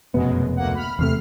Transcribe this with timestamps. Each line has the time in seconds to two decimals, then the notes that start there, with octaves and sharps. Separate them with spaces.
0.14 F1 F#2 B2 G#3 B3
0.56 D2 A#3 F#5
0.75 B5 F6
0.99 E2 C3 A3 F6 C7